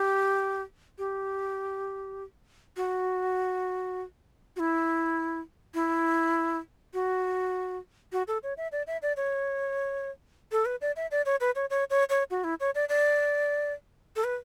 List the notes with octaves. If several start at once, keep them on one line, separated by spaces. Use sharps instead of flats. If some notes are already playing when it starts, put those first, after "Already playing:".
Already playing: G4
G4
F#4
F#4
E4
E4
F#4
F#4
A4
C#5
E5
D5
E5
D5
C#5
A4
B4
D5
E5
D5
C#5
B4
C#5
C#5
C#5
C#5
F#4
E4
C#5
D5
D5
A4
B4